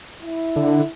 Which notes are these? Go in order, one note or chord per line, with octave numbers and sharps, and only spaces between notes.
E4
D3